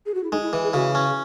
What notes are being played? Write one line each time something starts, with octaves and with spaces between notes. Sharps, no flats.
G#4
F#4
E4
G#3 D#4
E4
E3
G#4
C#3 F#4
C#4